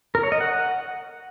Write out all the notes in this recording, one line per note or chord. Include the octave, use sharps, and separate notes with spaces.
A#4
C#5
D#5
F#5